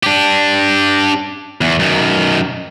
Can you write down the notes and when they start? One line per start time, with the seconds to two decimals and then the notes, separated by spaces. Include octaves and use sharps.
0.03 D4 G4
1.61 E2
1.79 F#2 D#3